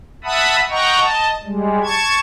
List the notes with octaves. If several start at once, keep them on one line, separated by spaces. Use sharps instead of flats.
E5 F#5 A5 B5 D#6
D#5 F#5 G5 A#5 C#6
D#5 A5
G3 G#3
A5 C#6 G#6